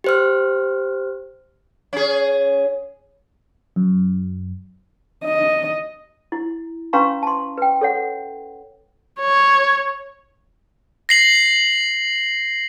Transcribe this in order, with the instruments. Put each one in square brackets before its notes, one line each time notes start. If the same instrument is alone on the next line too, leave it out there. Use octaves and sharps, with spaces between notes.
[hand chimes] G4 C5 F6
[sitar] C#4 G#4
[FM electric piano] F#2
[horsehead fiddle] D#5
[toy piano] E4
C#4 B4 F5 A#5 C6 C#6
A5 C6
B4 G5
A4 C#5 F#5
[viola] C#5
[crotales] A#6 C7 F#7